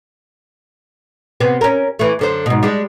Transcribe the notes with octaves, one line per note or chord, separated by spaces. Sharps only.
C3 B3 C4
C#4 A#4
E3 A3
F#2 D3 C5
G#2 B2
G3 G#3 D4